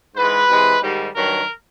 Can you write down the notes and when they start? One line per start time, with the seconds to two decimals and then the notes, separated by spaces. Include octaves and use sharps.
0.14 G#2 E3 G#3 B4
0.48 C3 E3 G#3
0.82 G#2 D#3 G3
1.15 G2 D#3 F#3 A#4